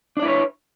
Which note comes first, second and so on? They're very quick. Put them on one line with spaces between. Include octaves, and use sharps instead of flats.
D4 D5 E4 B4 C#5